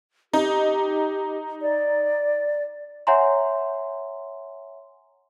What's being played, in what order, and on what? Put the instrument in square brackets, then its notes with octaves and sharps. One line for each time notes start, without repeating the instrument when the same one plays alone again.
[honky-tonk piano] D#4 [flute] G4
[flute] D5
[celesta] C#5 E5 F#5 G#5 A#5 C6